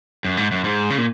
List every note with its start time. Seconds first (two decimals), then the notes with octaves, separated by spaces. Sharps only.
0.25 F#2
0.37 G#2
0.52 F#2
0.64 G#2
0.90 C#3
0.98 A#2